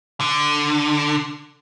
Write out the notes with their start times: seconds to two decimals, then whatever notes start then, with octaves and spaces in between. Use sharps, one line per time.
0.20 D3